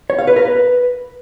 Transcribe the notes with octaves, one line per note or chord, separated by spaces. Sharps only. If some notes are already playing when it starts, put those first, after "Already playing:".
C#5
F5
B4
A#4
B4